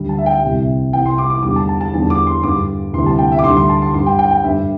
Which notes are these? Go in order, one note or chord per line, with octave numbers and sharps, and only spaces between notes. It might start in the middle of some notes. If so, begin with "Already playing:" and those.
Already playing: D2 D3 G3
A5
E5
G5
C2 C3 G3
C2 C3 E3 G5
C6
D6
D6
E2 D3 G3 D6
A5
A5
A5
E2 D3 G3 A5
D6
C6
G2 D3 G3 D6
D2 C3 E3 G3 C6
A5
G5
E5
D6
D2 D3 G3 C6
C6
A5
C6
G2 G3 C6
G5
G5
G5
G2 D3 G3 E5